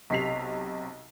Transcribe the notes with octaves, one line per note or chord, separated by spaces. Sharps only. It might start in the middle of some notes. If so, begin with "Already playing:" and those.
B1 C3 B6 C7 F7